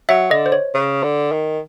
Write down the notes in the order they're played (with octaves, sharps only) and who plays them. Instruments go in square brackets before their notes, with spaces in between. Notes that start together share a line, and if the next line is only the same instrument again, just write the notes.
[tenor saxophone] F#3 [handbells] E5
[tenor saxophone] D3 [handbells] D#5
[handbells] C5
C#5
[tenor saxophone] C#3
D3
D#3